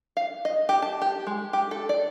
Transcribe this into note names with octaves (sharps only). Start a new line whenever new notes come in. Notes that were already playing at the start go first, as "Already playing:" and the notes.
F5
D#5
G4
A5
G4
G#3
G4
A4
D5